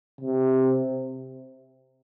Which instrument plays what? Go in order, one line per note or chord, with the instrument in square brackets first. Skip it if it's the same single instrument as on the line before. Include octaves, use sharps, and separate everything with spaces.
[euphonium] C3